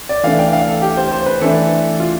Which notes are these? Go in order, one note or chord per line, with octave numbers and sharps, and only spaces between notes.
D5
E3 A3 D4 F5
G5
F5
A4
G4
C5
C5
B4
E3 A3 D4 A4
F4